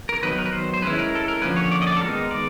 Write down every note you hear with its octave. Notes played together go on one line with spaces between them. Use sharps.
A#4
D#3 F#3 B3 D#4 B4
A#4
B4
C5
C5
G#3 C#4 E4 B4
A#4
A4
A#4
D3 F3 A#3 C#4 B4
C#5
D5
D#5
D5
A4
D#3 G#3 B3 D#4 A#4
D5